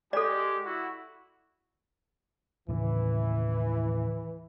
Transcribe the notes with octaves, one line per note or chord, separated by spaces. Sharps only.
G#3 G4 A4 D5
E4 F#4
D#2 A2 C#3 E3